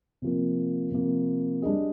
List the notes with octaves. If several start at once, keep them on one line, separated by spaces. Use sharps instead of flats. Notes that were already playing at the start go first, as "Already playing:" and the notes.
C3 F3 A#3
C3 F3 A#3
G3 D4 G#4 D#5